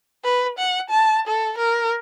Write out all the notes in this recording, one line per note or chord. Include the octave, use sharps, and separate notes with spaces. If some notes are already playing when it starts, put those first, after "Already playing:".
B4
F#5
A5
A4
A#4